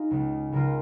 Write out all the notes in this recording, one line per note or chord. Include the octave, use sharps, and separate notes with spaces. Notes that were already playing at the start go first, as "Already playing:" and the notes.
Already playing: D#4 F4 G#4
C#2 C#3 G#3
C#2 C#3 G#3 F4 A#4